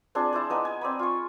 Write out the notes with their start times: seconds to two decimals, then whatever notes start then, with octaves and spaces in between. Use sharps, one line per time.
0.15 C4 D4 F4 G#4
0.33 E4 C5 D5
0.50 B3 D#4 G#5
0.65 G#5
0.81 C4 D5 B5
0.99 F4 C#6